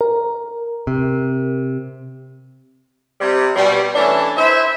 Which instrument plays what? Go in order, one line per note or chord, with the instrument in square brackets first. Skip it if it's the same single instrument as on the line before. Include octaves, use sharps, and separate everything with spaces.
[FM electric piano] A#4
[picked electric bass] C3
[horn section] C3 G3
B2 G3
E3 A3 C#4 D4 A5
E4 C5 E5